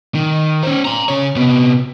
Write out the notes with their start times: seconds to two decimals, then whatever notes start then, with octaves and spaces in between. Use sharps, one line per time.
0.15 D#3
0.63 C#4 C5
0.85 A#5 C6
1.08 C#3 C#5
1.36 C3 B3